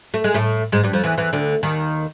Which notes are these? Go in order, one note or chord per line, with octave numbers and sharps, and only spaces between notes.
A3
G#3
A2 A3
G#2 G#3
G2 G3
F2 F3
E2 E3
E2 E3
D2 D3
D#2 D#3